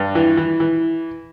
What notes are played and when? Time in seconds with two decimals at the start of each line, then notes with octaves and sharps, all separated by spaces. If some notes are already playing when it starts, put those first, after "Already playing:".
Already playing: G2
0.15 E3
0.37 E3
0.60 E3